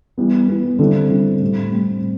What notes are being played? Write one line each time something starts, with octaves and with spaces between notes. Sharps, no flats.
E3 G3 B3
E3 G3 B3
D3 G3 C4 E4
D3 G3 C4 E4
A2 G3 C4
A2 G3 C4